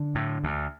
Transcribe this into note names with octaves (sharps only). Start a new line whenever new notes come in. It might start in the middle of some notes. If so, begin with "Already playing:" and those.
Already playing: D3
A2
D2